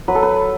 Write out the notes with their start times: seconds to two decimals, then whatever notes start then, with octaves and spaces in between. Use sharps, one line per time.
0.08 F#3 B4
0.15 A4
0.23 B4